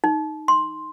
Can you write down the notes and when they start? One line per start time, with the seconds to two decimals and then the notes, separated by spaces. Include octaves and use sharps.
0.04 D#4
0.48 C6